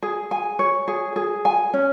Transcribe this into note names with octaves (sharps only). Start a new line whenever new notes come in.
G#4
G#5
C#5
G#4
G#4
G#5
C#4